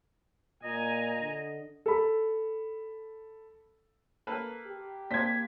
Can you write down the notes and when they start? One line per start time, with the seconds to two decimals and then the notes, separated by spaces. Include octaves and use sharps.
0.64 A#2 D#5 G#5 A#5
1.21 D3
1.86 A4 B5
4.27 A#3 A4 B4
4.66 G4
5.11 A#3 D4 C5 G#6 B6